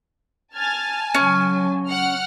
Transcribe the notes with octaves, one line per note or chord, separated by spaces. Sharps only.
G#5 A5 F6 G#6 A6
C#3 F#3 C#4
F#5 F6